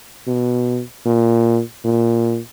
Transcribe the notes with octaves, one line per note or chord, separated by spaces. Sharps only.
B2
A#2
A#2